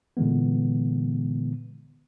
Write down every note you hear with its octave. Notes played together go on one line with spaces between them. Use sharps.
A#2 D3 E3 G#3 B3